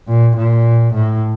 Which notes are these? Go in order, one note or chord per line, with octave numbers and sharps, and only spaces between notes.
A#2
A#2
A2